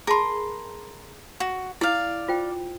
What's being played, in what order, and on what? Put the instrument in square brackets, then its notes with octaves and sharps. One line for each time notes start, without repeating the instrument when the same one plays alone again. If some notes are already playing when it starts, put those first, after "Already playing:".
[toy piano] G#4 A5 B5 [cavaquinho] A#4 C6
[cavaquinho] F#4
[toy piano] E4 [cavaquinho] D5 F5
[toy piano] F4 C5 G5